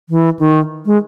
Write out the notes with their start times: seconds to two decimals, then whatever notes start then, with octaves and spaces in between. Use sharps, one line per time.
0.09 E3
0.39 D#3
0.86 G#3